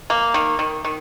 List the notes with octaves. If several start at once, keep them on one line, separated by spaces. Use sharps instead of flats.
A#3
D#3
D#3
D#3